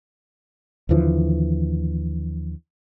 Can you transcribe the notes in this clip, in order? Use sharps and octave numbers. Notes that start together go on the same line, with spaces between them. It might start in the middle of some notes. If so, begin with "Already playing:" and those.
D#2 D3 E3 F3